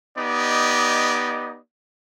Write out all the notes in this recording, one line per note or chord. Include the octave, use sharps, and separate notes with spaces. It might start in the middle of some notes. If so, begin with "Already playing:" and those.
B3 D#4 G4 D5 D#5